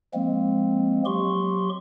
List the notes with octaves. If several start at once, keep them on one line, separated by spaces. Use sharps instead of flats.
F3 G#3 A#3 C4
F#3 G4 C6 C#6